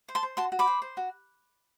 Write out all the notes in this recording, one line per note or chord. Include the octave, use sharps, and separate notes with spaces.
C5
A5 C6
C5
F#4 A5 C6
F#4
B5 D6
C5
C5
F#4